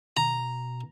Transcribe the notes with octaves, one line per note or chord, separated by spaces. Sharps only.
B2 A#5